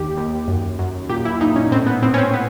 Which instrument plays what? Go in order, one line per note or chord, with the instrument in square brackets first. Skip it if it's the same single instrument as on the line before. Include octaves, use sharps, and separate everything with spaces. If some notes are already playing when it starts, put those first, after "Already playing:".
Already playing: [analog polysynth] D#2 G4
D#2
F#2
F#2
A#2 G4
E4
A#2 D#4
C#4
A2 C4
B3
A2 C4
C#4
C4
B3